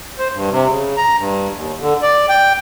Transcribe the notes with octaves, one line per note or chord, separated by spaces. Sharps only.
C5
G2
C3
C#3
A#5
G2
D#2
D3
D5
G5